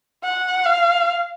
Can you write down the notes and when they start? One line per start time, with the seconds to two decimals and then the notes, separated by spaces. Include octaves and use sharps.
0.24 F#5
0.65 F5